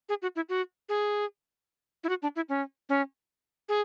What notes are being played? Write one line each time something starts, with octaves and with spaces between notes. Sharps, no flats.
G#4
F#4
E4
F#4
G#4
E4
F#4
D4
E4
C#4
C#4
G#4